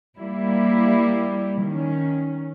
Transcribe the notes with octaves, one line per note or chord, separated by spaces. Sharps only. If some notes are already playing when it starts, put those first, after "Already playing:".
G3 A#3 E4
D#3 C#4